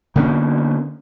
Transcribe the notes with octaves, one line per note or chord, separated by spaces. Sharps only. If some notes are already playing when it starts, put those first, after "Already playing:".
D3 A#3 B3 C#4